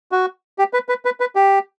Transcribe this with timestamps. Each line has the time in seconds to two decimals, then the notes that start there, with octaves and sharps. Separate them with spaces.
0.12 F#4
0.59 G4
0.73 B4
0.89 B4
1.05 B4
1.20 B4
1.36 G4